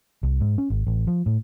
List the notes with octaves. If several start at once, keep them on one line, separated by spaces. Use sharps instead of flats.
C2
G#2
C#4
G#1
A1
F3
A2